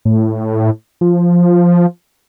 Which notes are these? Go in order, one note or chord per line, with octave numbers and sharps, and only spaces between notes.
A2
F3